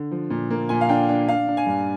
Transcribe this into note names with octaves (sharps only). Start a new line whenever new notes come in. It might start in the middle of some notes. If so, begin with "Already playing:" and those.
Already playing: D3
F3
A#2
A#3
A#2 G#5
F5
D4 G5
D4
D4 F5
D4
G#5
G2